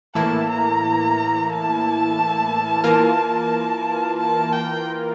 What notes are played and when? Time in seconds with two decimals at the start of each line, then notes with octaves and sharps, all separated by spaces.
0.15 A2 E3 A#3 E4 A5
0.49 A#5
1.50 A5
2.84 E3 A#3 F4 A#4
4.19 A5
4.52 G5